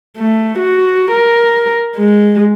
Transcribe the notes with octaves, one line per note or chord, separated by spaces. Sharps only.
A3
F#4
A#4
G#3